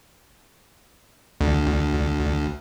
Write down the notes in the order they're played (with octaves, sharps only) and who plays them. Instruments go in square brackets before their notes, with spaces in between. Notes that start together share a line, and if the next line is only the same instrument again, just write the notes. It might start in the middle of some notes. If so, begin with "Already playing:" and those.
[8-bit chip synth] D2